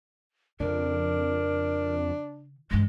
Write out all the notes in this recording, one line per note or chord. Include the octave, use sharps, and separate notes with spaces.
F2 C#3 D4 A#4
G2 E3 G#3